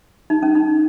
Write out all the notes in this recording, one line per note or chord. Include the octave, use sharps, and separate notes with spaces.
D#4
C#4
D#4